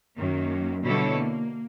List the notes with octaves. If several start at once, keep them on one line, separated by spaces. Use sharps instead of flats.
F#2 D#3 A#3
B2 D3 G3 E4 A4 C#5
A#3